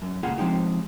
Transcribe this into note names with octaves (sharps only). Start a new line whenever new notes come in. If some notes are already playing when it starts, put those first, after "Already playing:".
F#2
C#2 A#2 F4 G#4 F#5
F3 G#3 C4 D#4 G4